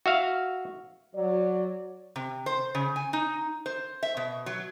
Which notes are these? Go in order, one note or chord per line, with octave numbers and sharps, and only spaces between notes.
F#4 E5 F5
F#3 D5
C3
C5
C#3
G#5
D#4
C5
E5
B2
F#3